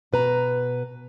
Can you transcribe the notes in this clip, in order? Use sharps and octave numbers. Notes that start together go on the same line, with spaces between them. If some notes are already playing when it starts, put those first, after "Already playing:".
B2 B4 A#5